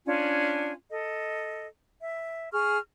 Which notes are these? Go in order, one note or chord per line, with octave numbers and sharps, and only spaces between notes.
C#4 D4 F4 G#5
A4 D#5
E5
G#4 C#6 F6